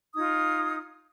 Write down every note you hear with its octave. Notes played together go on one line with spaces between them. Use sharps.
D#4 F4 D#6 G#6